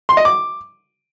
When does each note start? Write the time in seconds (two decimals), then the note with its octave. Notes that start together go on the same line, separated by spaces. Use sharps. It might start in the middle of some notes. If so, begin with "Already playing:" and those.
0.09 C6
0.17 D#5
0.25 D6